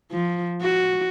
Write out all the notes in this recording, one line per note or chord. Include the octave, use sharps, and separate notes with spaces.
F3
F#4